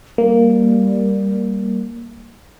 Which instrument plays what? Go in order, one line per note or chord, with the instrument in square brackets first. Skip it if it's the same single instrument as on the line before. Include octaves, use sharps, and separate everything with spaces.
[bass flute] G3 [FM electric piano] A#3